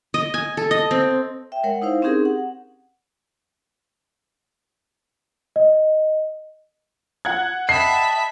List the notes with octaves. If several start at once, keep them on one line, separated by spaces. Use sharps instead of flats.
D#5
G#5
A4
D#5
C4
E5 G5
G#3 A#4 C#5 F#5
D#4 E4 C5 F5
C4 C#4 D#4 G4 G#4 A#4
F#5
D#5
F#5 F#6 G#6
D#5 E5 G5 A5 B5 C7